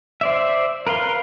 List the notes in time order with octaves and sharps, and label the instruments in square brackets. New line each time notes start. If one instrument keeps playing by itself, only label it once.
[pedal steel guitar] C5 D5 E5
A#4 B4 F5 C6